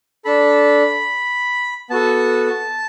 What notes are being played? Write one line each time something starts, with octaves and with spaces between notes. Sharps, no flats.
D4 A4 B5
B3 F#4 A4 A5